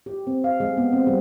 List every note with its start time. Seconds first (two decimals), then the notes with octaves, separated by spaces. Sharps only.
0.06 G4
0.27 C4
0.44 F5
0.60 G#3
0.77 B3
0.93 C4
1.07 G3